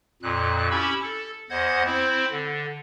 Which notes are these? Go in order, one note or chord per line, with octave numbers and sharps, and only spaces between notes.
F2 A#2 F#6
C#4 E4 G4 B5 C#6 E6
A4
E2 C5 D#5 F#5 G#6
C4 E4 C5
D3